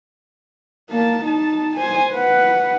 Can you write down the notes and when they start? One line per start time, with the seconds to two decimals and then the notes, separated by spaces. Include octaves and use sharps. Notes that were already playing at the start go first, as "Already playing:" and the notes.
0.90 A#3 A5
1.24 D#4 A5
1.76 C5 G#5
2.13 B4 F#5